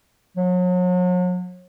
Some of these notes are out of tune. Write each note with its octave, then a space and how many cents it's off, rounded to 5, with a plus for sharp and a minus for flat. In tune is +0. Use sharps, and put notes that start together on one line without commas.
F#3 -40